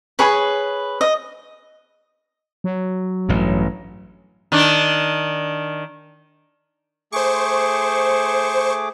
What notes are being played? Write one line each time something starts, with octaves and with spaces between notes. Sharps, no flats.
G#4 B4 C#5 B5
D#5
F#3
A1 G2
D#3 D4
A3 G#4 C5 C#6 D6